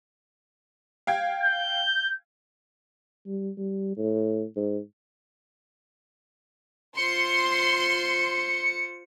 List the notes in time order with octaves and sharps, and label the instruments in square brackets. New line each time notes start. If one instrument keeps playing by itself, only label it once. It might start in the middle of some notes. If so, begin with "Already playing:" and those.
[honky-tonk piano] F5 G5 G#6
[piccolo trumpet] G6
[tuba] G3
G3
A2
G#2
[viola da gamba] F4 C5 [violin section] C6 [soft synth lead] C#7